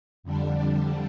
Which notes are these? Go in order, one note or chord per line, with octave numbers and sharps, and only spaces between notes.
F2 D3 G3 D4